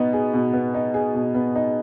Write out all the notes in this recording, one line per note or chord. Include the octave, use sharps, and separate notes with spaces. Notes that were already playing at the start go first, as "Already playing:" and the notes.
Already playing: B2 B3 D#4
G#4
B2
B3
D#4
G#4
B2
B3
D#4